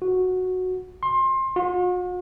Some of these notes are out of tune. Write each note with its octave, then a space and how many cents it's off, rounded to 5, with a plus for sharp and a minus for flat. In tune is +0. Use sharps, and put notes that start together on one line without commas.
F#4 -5
C6 +25
F#4 -45